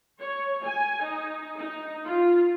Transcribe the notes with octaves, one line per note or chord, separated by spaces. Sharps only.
C#5
G#5
D#4
D#4
F4